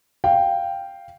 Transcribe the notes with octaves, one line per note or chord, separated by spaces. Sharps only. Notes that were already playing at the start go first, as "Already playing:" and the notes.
F5 G5